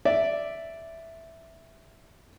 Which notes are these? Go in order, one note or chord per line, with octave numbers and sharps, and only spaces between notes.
D5 E5